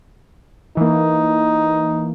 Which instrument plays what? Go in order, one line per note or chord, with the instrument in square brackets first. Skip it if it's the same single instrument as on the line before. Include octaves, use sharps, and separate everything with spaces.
[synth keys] E3 A#3 [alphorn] D#4